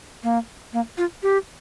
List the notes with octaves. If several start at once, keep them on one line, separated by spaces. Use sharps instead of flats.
A#3
A#3
F4
G4